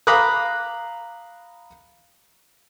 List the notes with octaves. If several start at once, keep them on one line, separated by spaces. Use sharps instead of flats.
F5 A#5 B5 D6 D#6 F#6